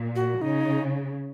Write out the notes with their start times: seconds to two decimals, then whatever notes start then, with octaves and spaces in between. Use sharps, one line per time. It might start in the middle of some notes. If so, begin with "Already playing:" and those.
Already playing: A#2
0.16 F#4
0.41 C#3 D#4